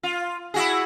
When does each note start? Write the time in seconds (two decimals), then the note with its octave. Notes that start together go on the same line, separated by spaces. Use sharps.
0.03 F4
0.54 E4 F#4 G#4